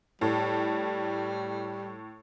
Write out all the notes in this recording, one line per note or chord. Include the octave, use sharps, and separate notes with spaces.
A2 G3